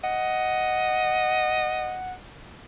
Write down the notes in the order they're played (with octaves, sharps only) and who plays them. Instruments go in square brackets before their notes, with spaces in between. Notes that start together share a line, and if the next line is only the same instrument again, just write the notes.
[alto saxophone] D#5 [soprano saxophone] F#5